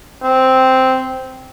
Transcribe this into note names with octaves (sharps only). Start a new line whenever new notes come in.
C4